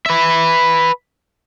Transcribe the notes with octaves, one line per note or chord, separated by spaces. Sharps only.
B4 E5